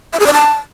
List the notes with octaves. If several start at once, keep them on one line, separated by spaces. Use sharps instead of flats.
E5
G#4
D5
A5